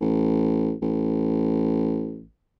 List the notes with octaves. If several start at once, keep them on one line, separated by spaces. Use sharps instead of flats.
A1
A1